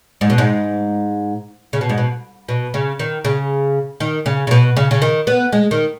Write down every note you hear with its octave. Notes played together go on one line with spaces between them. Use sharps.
G#2
B2
G#2
C#3
B2
G#2
B2
B2
C#3
D#3
C#3
D#3
C#3
C#3
B2
C#3
C#3
D#3
B3
G#3
D#3